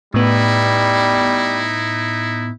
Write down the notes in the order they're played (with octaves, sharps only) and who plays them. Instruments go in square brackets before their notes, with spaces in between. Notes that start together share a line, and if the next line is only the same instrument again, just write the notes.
[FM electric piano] A2 B3 [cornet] G3 [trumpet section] D#4 E4